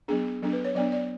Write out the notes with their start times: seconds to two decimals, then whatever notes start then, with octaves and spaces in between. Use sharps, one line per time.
0.08 F#3 B3 D4 G#4
0.42 F#3 B3 D4 A4
0.53 B4
0.65 C#5
0.75 F#3 B3 D4 D5
0.92 D5